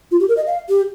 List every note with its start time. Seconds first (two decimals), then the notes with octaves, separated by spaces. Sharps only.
0.11 F4
0.20 G4
0.28 A#4
0.37 D#5
0.46 F5
0.69 G4